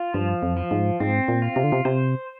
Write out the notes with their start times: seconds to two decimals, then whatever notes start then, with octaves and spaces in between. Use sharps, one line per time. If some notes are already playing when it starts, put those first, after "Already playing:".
Already playing: F4
0.14 G2 F3
0.43 F2
0.57 F3
0.71 G#2
1.00 G#2 C4
1.28 A#2
1.42 F4
1.56 C3
1.64 D3
1.72 C3
1.85 C3 C5